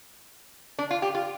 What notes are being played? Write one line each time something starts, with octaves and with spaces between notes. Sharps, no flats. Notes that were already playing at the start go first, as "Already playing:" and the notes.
D4
F4
G4
F4